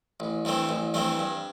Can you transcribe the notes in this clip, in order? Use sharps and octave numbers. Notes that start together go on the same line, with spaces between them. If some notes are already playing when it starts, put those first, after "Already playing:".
A1
G2 E3 A3 C4
A1
G2 E3 A3 C4
G2